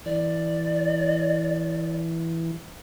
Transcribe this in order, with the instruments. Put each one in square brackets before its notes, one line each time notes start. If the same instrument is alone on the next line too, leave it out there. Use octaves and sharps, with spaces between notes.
[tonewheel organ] E3 [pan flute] D5